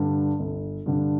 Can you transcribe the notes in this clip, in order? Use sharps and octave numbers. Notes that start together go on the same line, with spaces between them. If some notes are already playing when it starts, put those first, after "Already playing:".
Already playing: G2 D3
G1
G2 D3